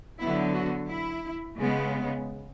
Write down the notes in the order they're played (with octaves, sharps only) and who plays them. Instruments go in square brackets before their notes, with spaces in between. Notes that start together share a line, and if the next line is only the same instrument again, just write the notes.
[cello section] D3 F#3 B3 E4
F#4
E4
C#3 G#3 B3